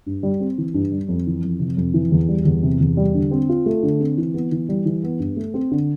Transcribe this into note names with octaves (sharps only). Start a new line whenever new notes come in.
G2
G3
C4
E3
G2
G3
F2
E3
F2
C3
F2
E3
E2
G3
E2
C3
E2
G3
D3
C4
F4
A3
D3
C4
E3
B3
E3
G3
E3
B3
G2
A3
C4
D3